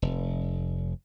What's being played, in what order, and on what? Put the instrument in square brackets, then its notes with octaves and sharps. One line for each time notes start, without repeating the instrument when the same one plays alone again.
[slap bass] F1